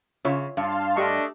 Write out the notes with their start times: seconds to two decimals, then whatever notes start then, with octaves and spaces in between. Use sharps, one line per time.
0.25 C#3 F4 C#5 E5
0.57 G2 F5 A5 C6
0.97 A3 D4 G4 D#5 C#6